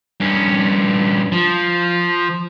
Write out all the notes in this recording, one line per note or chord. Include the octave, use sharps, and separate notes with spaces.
G2 C#4
F3